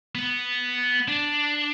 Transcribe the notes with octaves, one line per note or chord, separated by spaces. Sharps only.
B3
D4